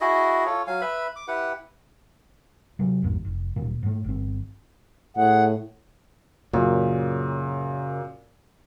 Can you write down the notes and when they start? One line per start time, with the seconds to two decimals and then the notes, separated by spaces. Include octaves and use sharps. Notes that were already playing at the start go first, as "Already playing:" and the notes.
0.01 E4 F#4 G#4 D#5
0.46 F4 A4 C#5
0.67 F#3 F5 G#5
0.81 B4 E5 B5
1.16 D6
1.28 E4 G4 B4 F#5
2.79 C3 F#3
3.02 A1 E2 G#2
3.25 F1
3.56 D1 A#2
3.83 G#2 A3
4.04 G1 C4
5.17 A2 G#4 F#5
6.53 F#2 A#2 C#3